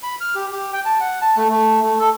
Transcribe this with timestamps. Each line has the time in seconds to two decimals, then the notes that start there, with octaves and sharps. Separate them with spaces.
0.03 B5
0.21 F6
0.35 G4
0.52 G4
0.73 G5
0.85 A5
1.00 F#5
1.21 A5
1.36 A3
1.49 A3
1.82 A3
1.99 A4